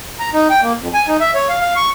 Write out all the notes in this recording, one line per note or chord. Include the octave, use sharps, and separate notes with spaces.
A#5
D#4
G5
A#3
F2
G#5
D#4
E5
C#5
F5
F5
C#6